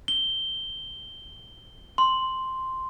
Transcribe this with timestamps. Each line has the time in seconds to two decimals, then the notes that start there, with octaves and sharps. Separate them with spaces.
0.08 G7
1.98 C6